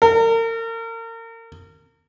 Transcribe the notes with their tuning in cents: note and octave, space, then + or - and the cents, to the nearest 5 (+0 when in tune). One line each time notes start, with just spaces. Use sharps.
A#4 -35